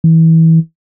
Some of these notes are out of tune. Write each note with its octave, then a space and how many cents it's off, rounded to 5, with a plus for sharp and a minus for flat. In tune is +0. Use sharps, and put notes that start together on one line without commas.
E3 -25